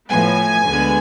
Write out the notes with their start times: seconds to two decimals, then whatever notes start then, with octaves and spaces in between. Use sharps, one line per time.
0.09 A2 F3 B3 G#5
0.67 D2 D3 G#3 B3